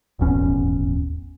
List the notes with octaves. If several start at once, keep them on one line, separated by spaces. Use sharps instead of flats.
D#1 G#1 E2 C#4